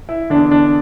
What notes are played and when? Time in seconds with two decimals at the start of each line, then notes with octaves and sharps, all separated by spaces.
0.09 E4
0.30 E2 D3 D4
0.51 D4